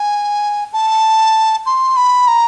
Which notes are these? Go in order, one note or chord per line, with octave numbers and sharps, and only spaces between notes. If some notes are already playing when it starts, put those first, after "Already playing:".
Already playing: G#5
A5
C6
B5
A#5